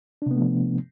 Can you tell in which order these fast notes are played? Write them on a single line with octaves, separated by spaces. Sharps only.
D4 C3 B3 A3 F3